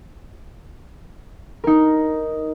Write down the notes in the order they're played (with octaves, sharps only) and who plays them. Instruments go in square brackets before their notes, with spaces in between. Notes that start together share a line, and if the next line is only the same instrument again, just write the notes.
[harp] D#4 A#4